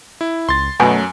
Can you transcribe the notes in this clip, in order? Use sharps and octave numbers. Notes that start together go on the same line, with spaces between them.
E4
C#2 C6 A6
F#2 B2 F#3 A3 G#5